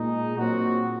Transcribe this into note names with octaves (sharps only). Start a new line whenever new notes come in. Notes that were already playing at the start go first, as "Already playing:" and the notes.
Already playing: A#2 G#3 D#4
A#2 F#3 C4 F#4